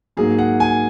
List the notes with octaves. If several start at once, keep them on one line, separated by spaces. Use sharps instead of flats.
G#2 F#3 A#3 G#4
F#5
G#5